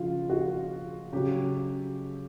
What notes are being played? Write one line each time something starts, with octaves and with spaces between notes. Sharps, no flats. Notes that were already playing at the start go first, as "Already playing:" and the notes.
Already playing: C#3 F3 F4
F#4
C#3 F#3 G4